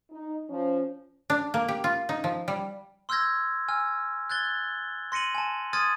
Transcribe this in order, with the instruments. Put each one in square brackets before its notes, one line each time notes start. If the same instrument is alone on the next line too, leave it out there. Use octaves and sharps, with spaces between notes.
[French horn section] D#4
F3 C#4
[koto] D4
A#3
G4
F4
D#4
F3
G3
[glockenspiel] C6 E6 F6 G6 G#6 A#6
G#5 E6 F6
F#6 G#6 A6 G7
C6 A#6 C#7 D#7 F#7
G#5 A5
C6 D#6 F6 G#6 A6 D#7